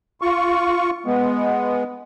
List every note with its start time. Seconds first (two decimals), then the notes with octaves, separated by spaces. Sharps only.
0.22 F4 C#6
1.06 G#3 B3